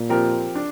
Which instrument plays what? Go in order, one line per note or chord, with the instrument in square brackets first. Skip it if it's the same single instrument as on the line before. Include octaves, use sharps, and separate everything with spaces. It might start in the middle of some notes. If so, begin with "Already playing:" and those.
Already playing: [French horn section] A#2
[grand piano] F3 C4 G4 A#4
D4